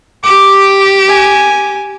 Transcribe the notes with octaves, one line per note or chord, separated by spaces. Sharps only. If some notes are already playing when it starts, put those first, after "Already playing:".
G4 D6
G#5